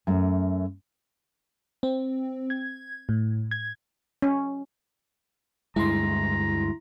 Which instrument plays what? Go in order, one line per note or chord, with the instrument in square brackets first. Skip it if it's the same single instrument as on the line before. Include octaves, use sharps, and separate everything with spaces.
[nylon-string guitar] F#2 A3
[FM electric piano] C4
G#6
A2
G#6
[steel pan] C#4
[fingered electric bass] D2 G2 G#3 [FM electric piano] E4 C6 [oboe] A#5